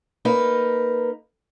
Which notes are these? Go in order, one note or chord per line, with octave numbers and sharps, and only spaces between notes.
A#3 D#4 B4